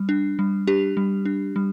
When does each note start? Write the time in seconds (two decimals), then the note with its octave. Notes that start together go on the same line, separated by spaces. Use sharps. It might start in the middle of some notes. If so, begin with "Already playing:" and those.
Already playing: G3
0.09 D4
0.39 G3
0.67 D4 G4
0.97 G3
1.25 D4
1.56 G3